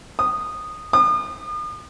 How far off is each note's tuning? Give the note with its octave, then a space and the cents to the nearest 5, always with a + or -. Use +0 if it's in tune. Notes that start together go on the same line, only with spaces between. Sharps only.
D#6 -10
D#6 -40